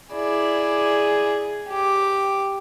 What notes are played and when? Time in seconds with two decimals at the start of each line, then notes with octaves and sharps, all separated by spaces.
0.13 E4 G#4 D5
1.69 G4 D6